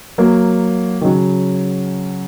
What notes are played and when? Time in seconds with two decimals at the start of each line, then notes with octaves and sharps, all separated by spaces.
0.18 F#3 A#3
1.01 D#3
1.05 C#3 F#3